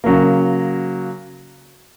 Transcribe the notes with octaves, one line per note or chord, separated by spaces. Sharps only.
C#3 F#3 A#3